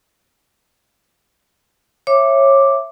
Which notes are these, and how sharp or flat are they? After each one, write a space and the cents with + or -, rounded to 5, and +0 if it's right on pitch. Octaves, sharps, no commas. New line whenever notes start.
C#5 -25 E5 +10 D6 +0